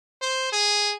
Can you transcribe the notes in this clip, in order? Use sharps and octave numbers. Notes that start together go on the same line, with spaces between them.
C5
G#4